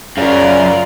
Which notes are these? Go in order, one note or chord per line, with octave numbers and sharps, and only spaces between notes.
F#2 C#3 F4 A#4 D5